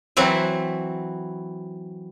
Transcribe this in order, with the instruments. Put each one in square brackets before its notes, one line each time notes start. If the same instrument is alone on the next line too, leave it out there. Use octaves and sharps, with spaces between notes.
[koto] E3 F#3 C4 E4